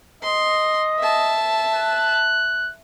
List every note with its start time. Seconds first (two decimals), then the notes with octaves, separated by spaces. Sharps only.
0.23 D#5 C6
0.99 E5 A5
1.76 F#6